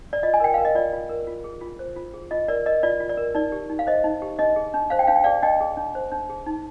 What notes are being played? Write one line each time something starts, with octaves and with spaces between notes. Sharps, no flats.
D5
F4 D#5
G#5
A#4 G5
A#4 F5
D#5
F4 D5
F4
A#4
F4
G#4
F4
C5
F4
G#4
F4 D#5
A#4 D5
A#4 D#5
F4 D5
F4
D5
A#4
D#4 D5
G4
D#4
F5
C5 D#5
D#4
G4
D4 D#5
G#4
D4
C5 F5
G5
D4 F5
G5
G#4 D5 F5
D4 D#5 G5
G#4
D4
C5
D4
G#4
D#4